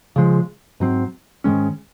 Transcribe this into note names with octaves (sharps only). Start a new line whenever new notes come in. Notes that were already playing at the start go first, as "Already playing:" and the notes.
C#3 F3 G#3
G#2 F#3 C4
G#2 D#3 G#3 C#4